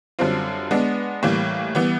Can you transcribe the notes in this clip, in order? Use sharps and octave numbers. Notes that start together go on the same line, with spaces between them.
F#2 D3 G3 C4 F4
G#3 B3 D4
A2 E3 G3 A#3
E3 G3 B3